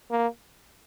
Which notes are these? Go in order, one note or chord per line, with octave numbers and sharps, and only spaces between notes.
A#3